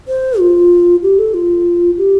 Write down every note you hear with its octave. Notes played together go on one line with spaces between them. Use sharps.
C5
F4
G4
A4
F4
G4